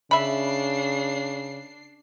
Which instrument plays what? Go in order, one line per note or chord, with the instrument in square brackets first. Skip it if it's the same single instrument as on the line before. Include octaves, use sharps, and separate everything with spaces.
[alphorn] C#3 [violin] D4 C7 [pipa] E5 B5